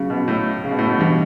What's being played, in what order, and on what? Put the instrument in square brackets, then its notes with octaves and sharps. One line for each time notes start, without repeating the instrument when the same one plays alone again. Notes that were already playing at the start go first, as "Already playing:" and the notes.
Already playing: [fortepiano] C#3 [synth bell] F#3 C#4 F#4
[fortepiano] B2
A2
C#3
B2
A2
B2
[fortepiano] B2 [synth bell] E3 G3 D4 G4